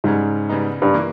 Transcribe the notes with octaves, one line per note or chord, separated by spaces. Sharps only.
G#2 C#3 G3 C#4
C#3 G3 B3 D#4
G2
E3 A#3